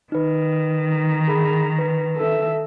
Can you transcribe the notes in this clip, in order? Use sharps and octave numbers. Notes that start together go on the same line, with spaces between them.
D#3 D#4 B4
A#5
G#4 A#4 B5
B4
A4 E5